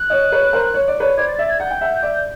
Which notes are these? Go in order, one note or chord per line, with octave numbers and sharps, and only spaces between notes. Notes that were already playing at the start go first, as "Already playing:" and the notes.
Already playing: F#6
C#5 D#5
B4 C#5
A#4 C5
C#5
D5
B4 C#5
C5 D5 G#6
A6
D5 E5 A6
G#6
F#5 G6
G5
E5 F#5
D5 E5